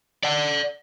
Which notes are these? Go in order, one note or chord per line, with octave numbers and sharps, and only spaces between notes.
D5 F#5